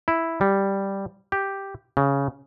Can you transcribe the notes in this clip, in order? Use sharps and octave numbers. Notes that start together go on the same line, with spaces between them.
E4
G3
G4
C#3